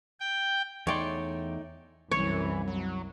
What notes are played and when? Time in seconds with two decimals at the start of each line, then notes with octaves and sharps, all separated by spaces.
0.20 G5
0.87 E2 A3 D#4 C#5 D5 G5 C6
2.11 C2 F#2 E3 C#5
2.68 F#3